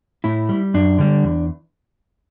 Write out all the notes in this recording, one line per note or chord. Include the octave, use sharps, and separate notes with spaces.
A2 E4
G3
F#2 D4
D3 G3
E2